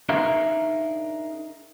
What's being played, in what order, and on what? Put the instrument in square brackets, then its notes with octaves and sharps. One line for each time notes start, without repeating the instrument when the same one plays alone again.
[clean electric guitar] D4 D#4 G#4 A#4 E5 F5